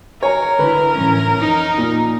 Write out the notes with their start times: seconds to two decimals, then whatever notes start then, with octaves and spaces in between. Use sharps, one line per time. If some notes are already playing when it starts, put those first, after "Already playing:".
0.23 A#4 C#5 G#5 A#5
0.59 D3 E4 B4
0.93 A2 E3 C#4
1.40 F2 D#4
1.77 A#2